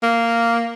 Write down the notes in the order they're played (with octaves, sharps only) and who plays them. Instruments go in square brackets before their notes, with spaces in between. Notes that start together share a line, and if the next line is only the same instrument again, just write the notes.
[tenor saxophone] A#3